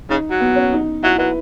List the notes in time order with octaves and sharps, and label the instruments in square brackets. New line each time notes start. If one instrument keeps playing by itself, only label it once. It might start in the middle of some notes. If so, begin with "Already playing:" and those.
[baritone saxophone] C#3 [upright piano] D#4
[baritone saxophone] F#3
[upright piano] B3
C#4
D#4
[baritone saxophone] F#3 [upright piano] E4
[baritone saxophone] F#3 [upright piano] B4